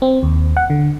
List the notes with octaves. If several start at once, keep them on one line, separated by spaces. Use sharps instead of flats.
C4
D#2
F#5
D3